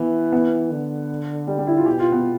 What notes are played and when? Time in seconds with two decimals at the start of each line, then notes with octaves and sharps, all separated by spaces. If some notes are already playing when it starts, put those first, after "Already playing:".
Already playing: E3 B3
0.33 B3
0.71 D3
1.47 G3
1.58 G3
1.67 E4
1.77 F4
1.86 B2 G4
1.99 F4
2.12 B3